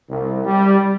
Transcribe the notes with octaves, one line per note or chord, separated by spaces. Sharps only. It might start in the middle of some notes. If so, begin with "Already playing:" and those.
C2
G3